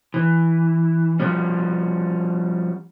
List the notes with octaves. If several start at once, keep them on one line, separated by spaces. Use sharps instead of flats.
E3
F3 G3 C#4